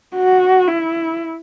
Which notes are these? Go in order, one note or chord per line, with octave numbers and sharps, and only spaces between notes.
F#4
E4